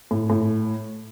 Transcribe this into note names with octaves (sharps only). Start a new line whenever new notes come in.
A2
A2